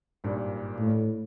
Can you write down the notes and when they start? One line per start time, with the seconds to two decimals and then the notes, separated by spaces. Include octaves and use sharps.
0.24 G#1 G2 A#2
0.79 A2